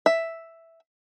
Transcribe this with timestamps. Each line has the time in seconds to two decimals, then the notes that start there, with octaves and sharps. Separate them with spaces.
0.06 E5